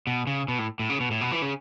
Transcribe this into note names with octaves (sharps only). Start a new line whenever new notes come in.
B2
C#3
B2
A2
A2
C#3
B2
A2
B2
E3
C#3